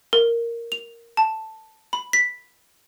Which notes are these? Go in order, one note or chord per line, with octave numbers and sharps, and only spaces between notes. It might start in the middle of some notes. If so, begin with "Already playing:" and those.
A#4
F7
A5
B5
B6